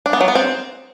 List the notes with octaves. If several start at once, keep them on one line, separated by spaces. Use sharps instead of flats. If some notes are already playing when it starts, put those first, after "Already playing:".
D4
B3
F#3
B3
C4